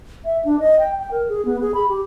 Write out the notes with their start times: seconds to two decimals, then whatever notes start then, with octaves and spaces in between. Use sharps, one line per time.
0.25 E5
0.45 D4
0.60 D#5
0.79 G5
0.99 G5
1.11 A#4
1.29 G#4
1.45 B3
1.61 G#4
1.74 B5
1.89 G4